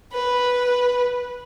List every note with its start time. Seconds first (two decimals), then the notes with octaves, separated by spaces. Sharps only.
0.13 B4